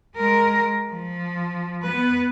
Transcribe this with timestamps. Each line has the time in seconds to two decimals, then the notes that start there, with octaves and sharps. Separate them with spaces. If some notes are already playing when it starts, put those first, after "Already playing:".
0.16 G#3 A#4
0.89 F3
1.83 B3 B4